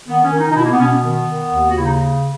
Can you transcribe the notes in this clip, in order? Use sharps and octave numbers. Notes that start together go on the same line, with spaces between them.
D#3 B3
C#4
D#3
D#4
D#4
B2 E4
A#3
B3
B2 C#4
B3
D#3 B3
D#3
D#2
F#4
C#3 E4
D#4